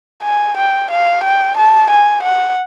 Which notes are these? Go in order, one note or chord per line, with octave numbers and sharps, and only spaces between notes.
G#5
G5
F5
G5
A5
G#5
F#5